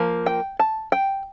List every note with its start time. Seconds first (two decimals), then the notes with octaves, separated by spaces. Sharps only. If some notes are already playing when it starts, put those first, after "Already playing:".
Already playing: F3 A#3
0.26 G5
0.59 A5
0.92 G5